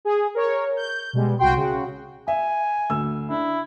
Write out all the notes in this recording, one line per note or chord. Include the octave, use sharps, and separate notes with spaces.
G#4
A#4 C#5
G6
B2 G3 G#3
C2 F#4 G5 C6
C#3 F#4
E5 G#5
D2 E6
D4 E4